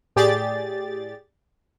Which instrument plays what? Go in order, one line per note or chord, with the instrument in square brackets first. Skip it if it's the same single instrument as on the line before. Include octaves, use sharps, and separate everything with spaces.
[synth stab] A2 G4 G#4 D5 A6